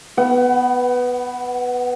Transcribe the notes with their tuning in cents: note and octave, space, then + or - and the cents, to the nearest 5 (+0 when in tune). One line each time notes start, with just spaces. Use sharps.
B3 +0 F#5 +35